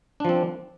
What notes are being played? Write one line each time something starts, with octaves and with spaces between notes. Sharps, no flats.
F3 C4 D4